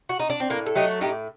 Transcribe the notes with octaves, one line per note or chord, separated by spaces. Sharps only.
F#4
D#4
D4
C4
A2 A#3
A4
F#3 A3 D#4 G4
A2 D#4 G4